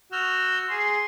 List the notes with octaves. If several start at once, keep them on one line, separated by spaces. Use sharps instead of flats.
F#4 E6 F6 G6
G#4 C6